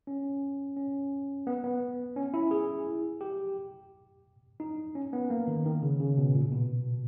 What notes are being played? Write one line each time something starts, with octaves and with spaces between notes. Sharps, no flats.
C#4
C#4
B3
B3
C#4
E4
G#4
G4
D#4
C#4
B3
A#3
D#3
D#3
C#3
C#3
B2
A#2
B2